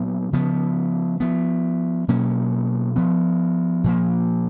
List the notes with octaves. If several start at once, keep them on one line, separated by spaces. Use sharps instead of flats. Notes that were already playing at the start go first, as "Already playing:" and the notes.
Already playing: A#2 F#3 B3
C#3 F3 B3
F3 B3
B2 F#3 A#3 C#4
F3 B3
A#2 F3 A#3